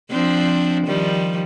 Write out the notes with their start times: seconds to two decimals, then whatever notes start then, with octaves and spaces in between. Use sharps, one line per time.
0.10 F3 C4 D4
0.86 D#3 F3 G3